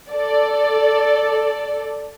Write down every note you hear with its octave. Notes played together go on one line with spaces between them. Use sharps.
A4 D5